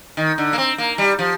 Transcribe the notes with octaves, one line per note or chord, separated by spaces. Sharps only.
D#3
D3
A#3
C4
A#3
G3
F3